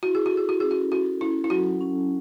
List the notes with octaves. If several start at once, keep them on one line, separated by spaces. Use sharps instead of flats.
E4 F#4
G#4
F#4
A4
G#4
F#4
C#4 G#4
F#4
F#4 A4
C#4 E4
E4
F#3 F#4
C#4